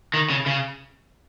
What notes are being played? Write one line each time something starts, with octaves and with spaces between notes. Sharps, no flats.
D#3
C#3
C#3